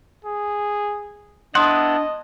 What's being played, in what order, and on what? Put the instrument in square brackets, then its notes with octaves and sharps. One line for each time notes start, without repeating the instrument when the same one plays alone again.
[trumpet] G#4
[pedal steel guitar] B3 E4 F#5 [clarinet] D4 [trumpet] D#5 [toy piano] C6 D#6